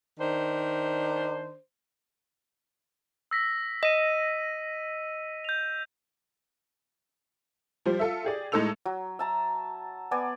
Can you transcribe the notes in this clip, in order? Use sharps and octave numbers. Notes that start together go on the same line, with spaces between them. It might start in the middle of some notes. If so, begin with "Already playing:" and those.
D#3 D4 C5
E6 A#6 B6
D#5 B6 D#7
G6 F7
F3 G3 C5
F4 A4 E5
G4 G#4 D5
A2 G#3 D#4 A4 E6 F7
F#3
E5 A5 A#5
B3 D5 G#5